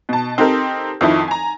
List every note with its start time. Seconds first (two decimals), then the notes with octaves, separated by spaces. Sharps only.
0.09 B2 A5
0.38 C4 D#4 G4 A4 A#4
1.01 F2 D#3 F3 D#4 E4
1.28 G#5 A#5